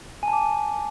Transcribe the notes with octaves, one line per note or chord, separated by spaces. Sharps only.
G#5
A5
D6